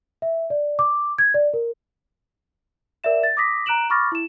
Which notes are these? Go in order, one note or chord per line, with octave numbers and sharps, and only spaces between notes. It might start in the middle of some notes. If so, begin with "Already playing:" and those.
E5
D5
D6
G#6
D5
A#4
A#4 D5 E5 E7
A6
D6 D#6 A#6 B6
A#5 F#6 D7 E7 F#7
B5 C#6 D6 F6 A6 A#6
E4 E7